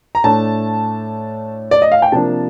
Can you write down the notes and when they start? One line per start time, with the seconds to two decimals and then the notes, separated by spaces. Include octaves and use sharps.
0.15 A#5
0.24 A2 A3 D4 A5
1.71 D5
1.82 D#5
1.92 F5
2.02 G5
2.12 C3 F3 A#3 D4 A5